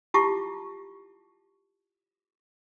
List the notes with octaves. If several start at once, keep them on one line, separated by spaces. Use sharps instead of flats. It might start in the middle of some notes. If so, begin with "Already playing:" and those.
E4 F4 G4 A5 C#6 D6